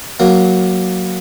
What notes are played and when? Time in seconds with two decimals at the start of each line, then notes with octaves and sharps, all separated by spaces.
0.20 F#3 A#3